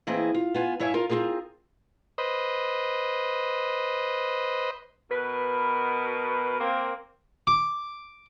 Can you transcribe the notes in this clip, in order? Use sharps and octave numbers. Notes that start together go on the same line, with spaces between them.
E3 A#3 C4 E4 G#4 D#5
F4
B3 F4 G#5
G2 E4 C#5 E5 F5 G#5
F4 A#4
C4 C#4 F4 G#4 A#4
B4 C5 D#5
B2 A#4 B4
A#3 C4
D6